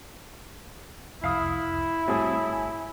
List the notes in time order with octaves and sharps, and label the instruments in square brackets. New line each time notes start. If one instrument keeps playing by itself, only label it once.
[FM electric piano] C2 F2 [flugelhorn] E4 [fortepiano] F5 D#6
[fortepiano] A2 G#4 D#6 [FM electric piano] G3 C4 F#4
[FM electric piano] G1 G#5